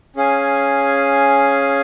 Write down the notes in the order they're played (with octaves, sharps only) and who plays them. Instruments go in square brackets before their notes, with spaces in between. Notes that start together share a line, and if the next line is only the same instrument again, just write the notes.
[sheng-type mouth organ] C#4 G#4 F5 G#5